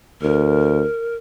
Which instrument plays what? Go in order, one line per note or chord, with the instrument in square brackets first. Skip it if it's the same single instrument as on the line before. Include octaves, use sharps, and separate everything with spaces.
[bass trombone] D2 [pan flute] A#4